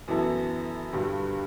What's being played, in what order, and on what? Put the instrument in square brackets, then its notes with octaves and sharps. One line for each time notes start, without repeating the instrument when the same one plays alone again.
[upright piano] F#2 E3 B3 E4 A4
G2 D3 G3